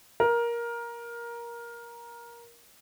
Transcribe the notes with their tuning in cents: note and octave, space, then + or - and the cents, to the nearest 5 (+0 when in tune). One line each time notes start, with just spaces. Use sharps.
A#4 +15